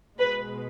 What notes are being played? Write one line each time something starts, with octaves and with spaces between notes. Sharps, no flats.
B2 G#3 B4